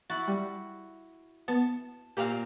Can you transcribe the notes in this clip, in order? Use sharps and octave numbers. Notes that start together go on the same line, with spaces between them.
E4 F#4 A6
G3
B3 A5
A#2 A#3 C4 G4 F5